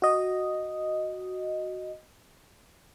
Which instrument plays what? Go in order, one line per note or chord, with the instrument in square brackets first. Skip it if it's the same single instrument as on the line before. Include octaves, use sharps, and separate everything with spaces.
[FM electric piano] F#4 D#5